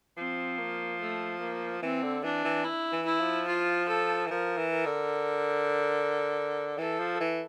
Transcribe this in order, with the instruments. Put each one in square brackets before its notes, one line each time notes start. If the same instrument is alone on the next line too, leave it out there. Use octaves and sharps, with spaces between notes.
[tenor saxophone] F3 [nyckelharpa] C4
[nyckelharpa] A#3
A3
A#3
[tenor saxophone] E3 [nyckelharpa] C4
[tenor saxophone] D3
[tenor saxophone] E3 [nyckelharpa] D4
[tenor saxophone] E3
[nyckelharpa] E4
[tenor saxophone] E3
[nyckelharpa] E4
[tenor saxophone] F3
[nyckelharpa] F4
A4
[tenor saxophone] E3
[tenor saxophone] F3 [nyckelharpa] A#4
[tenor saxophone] E3
[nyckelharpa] A#4
[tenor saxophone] D3
[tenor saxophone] E3 [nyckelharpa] A4
[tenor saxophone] F3
E3